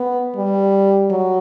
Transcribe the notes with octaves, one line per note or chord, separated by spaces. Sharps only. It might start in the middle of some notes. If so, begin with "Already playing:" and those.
Already playing: B3
G3
F#3